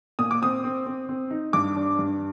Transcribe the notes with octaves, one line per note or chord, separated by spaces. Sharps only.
A#2 D#6
D6
C4 D#6
C4
C4
C4
D#4
G2 D6
D4
G2